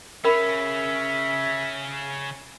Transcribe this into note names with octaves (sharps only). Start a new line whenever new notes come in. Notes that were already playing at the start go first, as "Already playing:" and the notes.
C#3 C#4 A#4 E5 B5